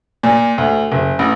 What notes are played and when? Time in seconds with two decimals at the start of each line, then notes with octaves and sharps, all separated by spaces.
0.23 A#2
0.58 D2
0.92 F#1
1.19 A1